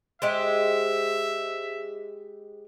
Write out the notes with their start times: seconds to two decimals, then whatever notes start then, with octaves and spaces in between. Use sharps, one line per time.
0.22 G#3 G4 C5 E5